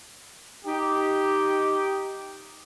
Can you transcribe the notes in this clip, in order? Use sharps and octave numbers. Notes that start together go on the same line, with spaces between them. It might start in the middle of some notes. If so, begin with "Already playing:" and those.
D#4 G4